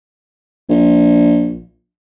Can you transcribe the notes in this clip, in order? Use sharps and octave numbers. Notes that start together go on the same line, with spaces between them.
A#1